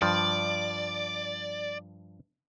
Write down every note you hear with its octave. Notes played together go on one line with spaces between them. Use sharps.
G2 F3 D5